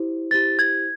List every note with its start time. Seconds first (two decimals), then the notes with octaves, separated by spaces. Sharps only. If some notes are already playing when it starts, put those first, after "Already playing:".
Already playing: E4 G4 C5
0.31 E4 G4 C5 A6
0.59 G#6